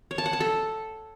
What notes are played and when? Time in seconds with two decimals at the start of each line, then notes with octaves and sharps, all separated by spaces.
0.11 C#5
0.18 A5
0.26 F#5
0.33 A5
0.40 A4